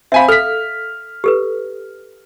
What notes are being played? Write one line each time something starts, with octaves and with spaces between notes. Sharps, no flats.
C4 E5 F5 G#5 B5
A4 F6 B6
G4 A4 B4